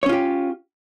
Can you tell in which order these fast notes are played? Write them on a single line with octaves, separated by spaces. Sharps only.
C#5 C#4 F4 G4